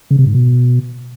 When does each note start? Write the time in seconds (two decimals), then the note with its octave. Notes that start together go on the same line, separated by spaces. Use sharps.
0.11 C#3
0.19 C3
0.26 G#2
0.34 B2